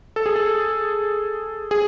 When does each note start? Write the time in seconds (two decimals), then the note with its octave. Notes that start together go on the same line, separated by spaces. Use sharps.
0.16 A4
0.26 G#4
0.36 A4
1.71 G#4